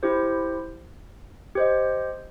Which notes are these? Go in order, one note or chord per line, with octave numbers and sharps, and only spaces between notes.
E4 G4 C5
G4 C5 D#5